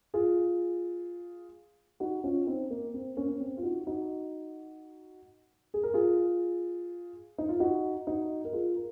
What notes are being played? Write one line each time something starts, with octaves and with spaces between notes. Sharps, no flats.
F4 G#4
D#4 F#4
C#4 F4
C4 D#4
A#3
C4
A#3 C#4
C#4
C4
F4
D#4 F#4
D#4 F#4
G#4
A#4
F4 G#4
D#4
F4
D#4 F#4
D#4 F#4
A#4
F4 G#4
A#4